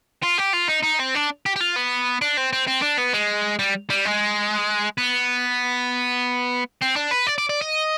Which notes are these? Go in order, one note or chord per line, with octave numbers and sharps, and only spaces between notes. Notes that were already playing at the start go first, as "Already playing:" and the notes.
F4
G4
F4
D#4
D#4
C4
D4
G4
G4
F4
B3
D4
C4
C4
C4
D4
B3
G#3
G3
G3
G#3
B3
C4
D4
B4
D5
D5
D5
D#5